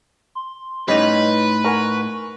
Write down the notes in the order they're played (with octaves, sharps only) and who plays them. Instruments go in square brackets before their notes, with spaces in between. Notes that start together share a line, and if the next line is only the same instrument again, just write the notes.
[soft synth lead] C6
[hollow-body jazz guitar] A2 D#4 [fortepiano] G3 C#4 D#5 [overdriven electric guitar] B4 [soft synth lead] C6
[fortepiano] A#4 F#5 G#5 [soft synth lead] C#6